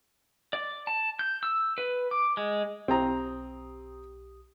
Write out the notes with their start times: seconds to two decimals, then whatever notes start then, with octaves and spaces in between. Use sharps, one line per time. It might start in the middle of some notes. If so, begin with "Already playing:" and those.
0.53 D5
0.87 A5
1.19 G6
1.43 E6
1.78 B4
2.11 D6
2.37 G#3
2.88 B1 C4 G4 A#5 D#6